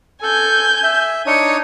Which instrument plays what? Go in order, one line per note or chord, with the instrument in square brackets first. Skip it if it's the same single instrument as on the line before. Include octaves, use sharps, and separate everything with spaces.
[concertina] A4 [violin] G#5 G6
[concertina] E5
[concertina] D4 D#4 C#5 [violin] C#7 D#7